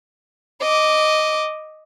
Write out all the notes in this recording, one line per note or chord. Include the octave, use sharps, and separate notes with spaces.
D#5 D6